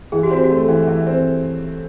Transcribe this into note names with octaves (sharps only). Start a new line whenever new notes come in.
E3 G#4
G4
C4 F#4
G4
A3
E3
E3
C4